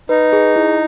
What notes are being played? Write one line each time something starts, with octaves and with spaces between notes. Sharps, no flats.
D#4 B4
G#4
E4